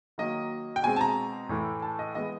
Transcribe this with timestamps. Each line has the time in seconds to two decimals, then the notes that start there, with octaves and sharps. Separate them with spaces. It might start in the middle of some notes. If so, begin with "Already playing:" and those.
0.18 D#3 F#3 A#3 D#5
0.76 G5
0.83 B2 G#3 C4 G#5
0.96 A5
1.01 A#5
1.49 A2 E3 A3
1.82 A5
1.99 D#5
2.15 E3 G#3 B3 D#5